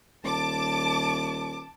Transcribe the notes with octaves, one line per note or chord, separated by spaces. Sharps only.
D#1 A5 D6